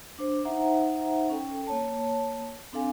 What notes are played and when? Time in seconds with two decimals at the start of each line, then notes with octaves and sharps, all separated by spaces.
0.19 D4 C5
0.45 D#4 C5 E5 F#5 A#5
1.30 C#4 A4 G5
1.67 A#3 C#5 A5
2.73 C4 D4 A4 F5 G#5